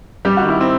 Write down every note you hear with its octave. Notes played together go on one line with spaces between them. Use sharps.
G3 G4
D#3 F#4
E4
C4